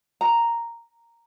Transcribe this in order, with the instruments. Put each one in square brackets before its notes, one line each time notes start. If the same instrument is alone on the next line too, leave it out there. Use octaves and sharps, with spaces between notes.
[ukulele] A#5